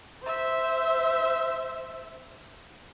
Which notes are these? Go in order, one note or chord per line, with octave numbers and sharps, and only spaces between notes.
C5 E5